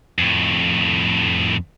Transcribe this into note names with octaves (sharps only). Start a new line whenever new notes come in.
F2 A2